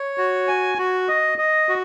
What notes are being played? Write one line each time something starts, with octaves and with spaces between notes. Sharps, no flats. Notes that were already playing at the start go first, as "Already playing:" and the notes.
Already playing: C#5
F#4
G#5
F#4
D#5
D#5
F#4